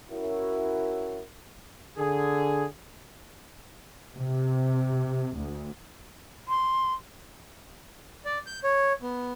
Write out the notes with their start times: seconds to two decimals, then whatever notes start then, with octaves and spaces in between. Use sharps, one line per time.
0.12 C#4 E4 F#4 A#4
1.98 D3 G#4
4.15 C3
5.36 D2
6.48 C6
8.25 D5
8.46 G6
8.64 C#5
9.02 B3